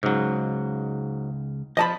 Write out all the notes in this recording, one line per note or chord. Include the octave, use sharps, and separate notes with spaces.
C#2 G#2 C#3 F#3
F3 D#5 A5 B5